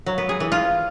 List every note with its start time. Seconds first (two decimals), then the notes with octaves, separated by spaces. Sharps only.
0.06 F#3
0.18 B3
0.29 G#4
0.40 E3
0.52 F4